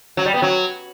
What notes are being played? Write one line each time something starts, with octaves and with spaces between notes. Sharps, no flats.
F#3
G3
B3
F#3